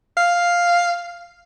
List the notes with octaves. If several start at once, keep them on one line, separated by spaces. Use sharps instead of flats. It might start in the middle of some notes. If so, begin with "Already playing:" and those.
F5